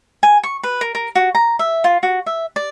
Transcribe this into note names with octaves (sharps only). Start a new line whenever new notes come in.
G#5
C#6
B4
A#4
A#4
F#4
A#5
E5
F4
F#4
E5
D5